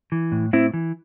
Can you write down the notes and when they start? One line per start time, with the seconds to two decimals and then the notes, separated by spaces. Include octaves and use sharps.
0.12 E3
0.32 A2
0.53 A2 C4 E4
0.74 E3